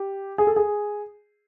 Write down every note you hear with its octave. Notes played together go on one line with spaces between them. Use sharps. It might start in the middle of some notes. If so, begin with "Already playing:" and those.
Already playing: G4
G#4
A4
G#4